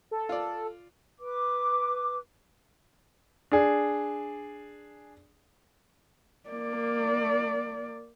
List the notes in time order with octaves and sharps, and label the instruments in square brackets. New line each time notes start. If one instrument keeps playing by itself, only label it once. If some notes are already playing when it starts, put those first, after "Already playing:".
[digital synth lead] A4
[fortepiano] F4 D5
[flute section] B4 D6
[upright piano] D4 G#4
[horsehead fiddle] A#3 D5